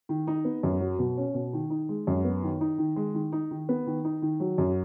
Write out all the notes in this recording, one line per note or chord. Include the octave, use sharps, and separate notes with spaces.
D#3
D#4
B3
F#2
F#3
B2
C#4
B2
D#3
D#4
G#3
F#2
B3
D#3
D#4
D#3
G#3
D#3
D#4
D#3
B3
D#3
D#4
D#3
F#3
F#2